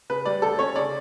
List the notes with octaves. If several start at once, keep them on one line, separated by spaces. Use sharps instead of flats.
C#3 B4
G3 D5
D2 A4
C#4 C#5
C#3 D5